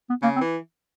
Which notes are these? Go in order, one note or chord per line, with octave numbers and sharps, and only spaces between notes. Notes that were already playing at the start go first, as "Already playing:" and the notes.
B3
C#3 A#3
C4
E3